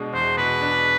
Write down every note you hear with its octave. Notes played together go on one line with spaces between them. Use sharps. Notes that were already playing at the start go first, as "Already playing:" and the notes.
Already playing: B2 G#3 D4
E2 C5
B2 B4
D4